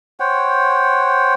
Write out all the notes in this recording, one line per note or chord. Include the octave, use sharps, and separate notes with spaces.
C5 C#5 F#5 G5